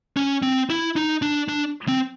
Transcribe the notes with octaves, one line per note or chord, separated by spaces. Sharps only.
C#4
C4
E4
D#4
D4
D4
C4